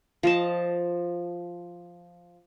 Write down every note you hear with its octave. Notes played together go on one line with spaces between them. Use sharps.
F3 D#5 A5